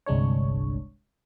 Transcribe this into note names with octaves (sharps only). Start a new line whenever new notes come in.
G1 C2 G#3 D4 C#5